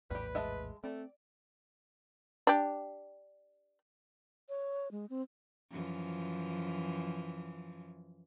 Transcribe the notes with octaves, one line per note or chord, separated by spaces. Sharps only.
A#1 E2 A2 G3 G4 B4
G#3 E5 A5
A3 C4 D5
D4 G4
C#5
G#3
C4
F#2 E3 F3